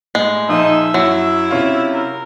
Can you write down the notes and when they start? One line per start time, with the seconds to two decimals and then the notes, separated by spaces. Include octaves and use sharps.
0.15 A2 G#3
0.49 A#2 F3 D#4 E5
0.94 F#2 F#3 E4
1.51 C3 C#4 F4 E5
1.94 A#4